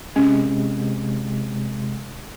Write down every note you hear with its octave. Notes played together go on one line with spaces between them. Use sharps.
C3 G#3 C#4